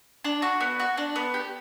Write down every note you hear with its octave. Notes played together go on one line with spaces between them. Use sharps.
D4
F#4
B3
F#4
D4
B3
G4